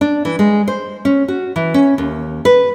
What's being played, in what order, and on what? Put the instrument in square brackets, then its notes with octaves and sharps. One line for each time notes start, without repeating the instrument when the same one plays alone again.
[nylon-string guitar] D4
E3
G#3
C5
C#4
F#4
E3
C#4
D#2
B4